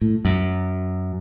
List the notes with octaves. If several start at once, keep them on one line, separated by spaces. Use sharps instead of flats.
A2
F#2